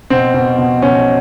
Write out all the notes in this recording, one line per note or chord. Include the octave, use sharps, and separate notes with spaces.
B2 C4
B2
B2
B2 C#4